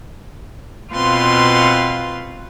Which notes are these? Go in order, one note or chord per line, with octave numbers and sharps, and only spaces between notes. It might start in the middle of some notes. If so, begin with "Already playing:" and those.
B2 C4 F4 B4 F5 C6